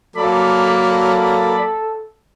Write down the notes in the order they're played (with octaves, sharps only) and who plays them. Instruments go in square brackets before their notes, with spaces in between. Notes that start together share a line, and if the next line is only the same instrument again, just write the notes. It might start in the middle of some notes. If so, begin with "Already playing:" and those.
[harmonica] F#3 A#3 [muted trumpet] A4 [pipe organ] D5 B5
[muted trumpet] A4